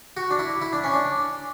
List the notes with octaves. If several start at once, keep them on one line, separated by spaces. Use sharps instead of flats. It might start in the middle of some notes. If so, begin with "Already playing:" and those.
F#4
D4
E4
E4
D4
C#4
D4